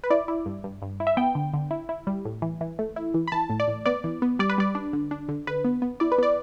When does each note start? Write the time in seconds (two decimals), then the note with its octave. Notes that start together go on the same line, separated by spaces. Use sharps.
0.04 B4
0.10 E4 D5
0.28 E4
0.46 G2
0.64 G2
0.82 G2
1.00 E4
1.07 E5
1.17 B3 G5
1.35 D3
1.54 D3
1.71 E4
1.89 E4
2.07 G3
2.25 A2
2.42 E3
2.61 E3
2.79 A3
2.96 E4
3.14 E3
3.28 B5
3.32 E3 A5
3.50 A2
3.60 D5
3.68 A2
3.86 B3 D5
4.04 E3
4.22 B3
4.39 G3 D5
4.50 B4
4.58 G3 D5
4.75 D4
4.93 D3
5.11 D4
5.29 D3
5.47 D3 B4
5.65 B3
5.82 B3
6.00 E4 D5
6.12 B4
6.18 B3 D5